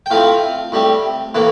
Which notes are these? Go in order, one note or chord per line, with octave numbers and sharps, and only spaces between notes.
G5
A2 F3 C4 F5
A2 G3 C4
A2 E3 A#3